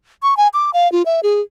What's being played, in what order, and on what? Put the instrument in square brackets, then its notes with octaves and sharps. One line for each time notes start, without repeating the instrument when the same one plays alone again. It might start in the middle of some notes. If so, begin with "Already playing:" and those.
[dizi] C#6
G#5
D6
F5
F4
E5
G#4